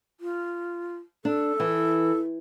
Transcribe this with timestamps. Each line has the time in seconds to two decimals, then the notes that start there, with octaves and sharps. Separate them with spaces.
0.20 F4
1.25 D4 A4
1.60 E3